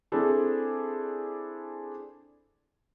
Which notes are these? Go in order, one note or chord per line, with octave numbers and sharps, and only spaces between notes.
C4 D4 E4 G#4 A4